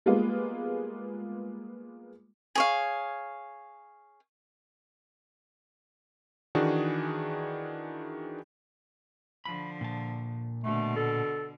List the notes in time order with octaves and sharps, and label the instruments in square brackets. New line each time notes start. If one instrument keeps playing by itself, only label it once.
[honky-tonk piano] G3 G#3 A#3 B3 F4 G#4
[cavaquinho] G#4 C#5 F5
[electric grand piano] D#3 E3 D4 F#4 G#4
[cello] D3 F3 [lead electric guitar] B5
[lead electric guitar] A#2 A5
[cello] B2 D3 [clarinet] A3
[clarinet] A4